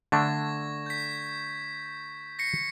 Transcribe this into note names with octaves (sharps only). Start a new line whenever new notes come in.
D3 A3 D4 C#6 G#6 A#6
G6 B6
A#6 C7 C#7